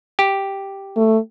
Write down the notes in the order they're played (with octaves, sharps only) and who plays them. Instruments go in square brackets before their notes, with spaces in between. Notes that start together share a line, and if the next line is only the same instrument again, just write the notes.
[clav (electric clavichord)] G4
[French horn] A3